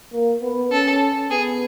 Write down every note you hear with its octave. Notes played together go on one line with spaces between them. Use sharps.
A#3
B3
C#4 A4
B3 G#4